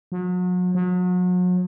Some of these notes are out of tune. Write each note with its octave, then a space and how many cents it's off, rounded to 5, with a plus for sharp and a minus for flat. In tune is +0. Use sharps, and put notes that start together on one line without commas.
F#3 -40
F#3 -40